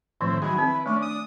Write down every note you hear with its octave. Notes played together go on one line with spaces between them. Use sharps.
A2 D#3 F3 C4 E4
F#3 D#4 E4 G#4
C4 B4
A3 C#4 D4
D#6